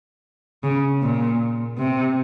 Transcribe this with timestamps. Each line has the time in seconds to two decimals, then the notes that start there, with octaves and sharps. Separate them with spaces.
0.63 C#3
1.02 A#2
1.78 C3